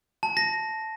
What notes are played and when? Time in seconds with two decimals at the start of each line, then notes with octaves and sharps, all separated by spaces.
0.23 A5
0.37 A#6